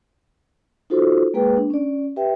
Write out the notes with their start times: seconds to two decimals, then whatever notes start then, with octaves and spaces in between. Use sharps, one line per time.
0.90 D#4 F4 F#4 A4 C5
1.34 G#3 A#3 G#4 B4 G5
1.57 D4
1.70 C#4 D5
2.16 G4 B4 E5 G5